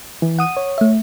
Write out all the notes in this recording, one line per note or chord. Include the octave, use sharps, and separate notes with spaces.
E3
F#5 D#6 D#7
C#5
A3 E5